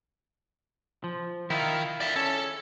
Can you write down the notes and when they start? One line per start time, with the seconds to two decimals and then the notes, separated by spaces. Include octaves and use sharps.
1.04 F3
1.50 D#3 E4 F4
2.00 D5 E5
2.16 C#4 A4